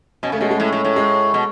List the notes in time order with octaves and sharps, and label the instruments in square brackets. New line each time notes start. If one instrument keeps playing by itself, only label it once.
[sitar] B2 [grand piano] C#4
[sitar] C#3 [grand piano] A3
[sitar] B2 [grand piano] G#3
[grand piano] G#3
[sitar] A2
A2
A2
[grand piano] G#3
[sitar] B2